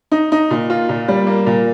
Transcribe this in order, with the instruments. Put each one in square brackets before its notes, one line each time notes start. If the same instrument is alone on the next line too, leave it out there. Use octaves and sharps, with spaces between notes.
[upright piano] D#4
D#4
A#2
F4
A#2
G3
A#3
A#2